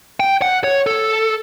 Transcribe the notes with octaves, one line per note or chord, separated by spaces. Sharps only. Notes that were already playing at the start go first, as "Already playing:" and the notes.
G5
F#5
C#5
A4